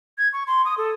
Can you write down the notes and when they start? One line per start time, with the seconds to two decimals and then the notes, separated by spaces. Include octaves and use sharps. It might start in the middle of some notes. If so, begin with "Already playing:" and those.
0.18 G#6
0.33 C#6
0.47 C6
0.65 D#6
0.78 A4